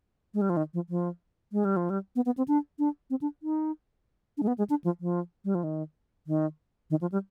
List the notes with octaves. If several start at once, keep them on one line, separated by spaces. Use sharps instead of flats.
G#3
G3
F3
D#3
F3
F3
G#3
G3
F3
G3
B3
B3
C4
D4
D4
C4
D4
D#4
D4
G#3
B3
G#3
D4
F3
F3
G3
F3
D#3
D#3
D#3
F3
G3